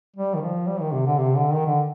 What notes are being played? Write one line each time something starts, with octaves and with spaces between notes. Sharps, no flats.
G3
D#3
F3
G3
D#3
C3
D3
C3
D3
D#3
D3